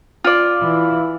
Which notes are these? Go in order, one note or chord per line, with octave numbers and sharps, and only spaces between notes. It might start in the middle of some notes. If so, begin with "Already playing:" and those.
F4 D5
E3 E4